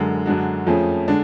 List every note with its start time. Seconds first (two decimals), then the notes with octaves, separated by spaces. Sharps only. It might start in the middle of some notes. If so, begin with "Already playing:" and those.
Already playing: F#2 D3 G#3
0.26 F#2 D3 G#3 D4 F#4
0.67 F2 F3 A3 C#4 G#4
1.08 D3 G#3 D4